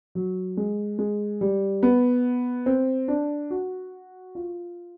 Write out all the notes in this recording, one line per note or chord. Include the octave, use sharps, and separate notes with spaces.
F#3
G#3
G#3
G3
B3
C4
D4
F#4
F4